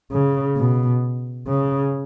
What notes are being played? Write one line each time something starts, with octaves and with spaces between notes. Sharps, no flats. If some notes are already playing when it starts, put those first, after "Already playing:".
C#3
B2
C#3